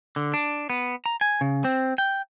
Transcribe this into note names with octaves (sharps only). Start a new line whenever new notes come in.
D3
D4
B3
A#5
G#5
C#3
C4
G5